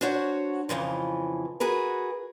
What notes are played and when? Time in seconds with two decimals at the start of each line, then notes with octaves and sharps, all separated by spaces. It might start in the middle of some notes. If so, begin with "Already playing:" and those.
0.01 D4 F#4 C5 C#5 F#5
0.69 F2 C#3 E3 F3
1.60 F#4 G#4 A#4 B4